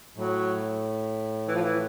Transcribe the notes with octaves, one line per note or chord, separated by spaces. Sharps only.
A2 F#3
E3
F3
E3